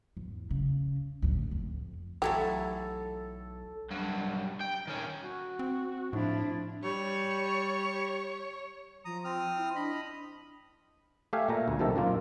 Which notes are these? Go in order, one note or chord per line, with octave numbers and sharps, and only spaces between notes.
E2 G#2
C#3
D2 A2
F2
B1 E3 F#3 A3 G4 A4
G2 F#3
G5
D#3 C#4
F#4
C4
A2 F3 D4 E4
G3 C#5
F3 A#5 D#6
C4 D#6 F6
E4
D4 D#5 B5
A3 G4 E5 F5 G#5
A#2 A3 A#5
D2
B1 C3 D#3 A4
F#2 A#2 A#3 F4